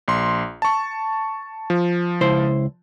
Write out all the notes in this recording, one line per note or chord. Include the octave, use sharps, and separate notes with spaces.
A#1 C6
A5 C#6
F3
C#2 E4 C5